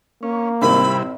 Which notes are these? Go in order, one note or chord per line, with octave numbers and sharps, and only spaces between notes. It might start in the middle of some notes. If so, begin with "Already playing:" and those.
A#3 C#4
G#1 C3 G3 C4 E4 A#4 B5